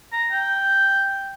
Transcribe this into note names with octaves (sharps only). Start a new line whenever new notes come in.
A#5
G5